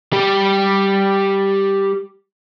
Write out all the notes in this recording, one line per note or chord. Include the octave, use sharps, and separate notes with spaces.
G3 G4